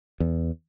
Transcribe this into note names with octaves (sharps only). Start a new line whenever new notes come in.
E2